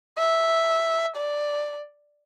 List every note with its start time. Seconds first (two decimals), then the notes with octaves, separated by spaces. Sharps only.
0.18 E5
1.16 D5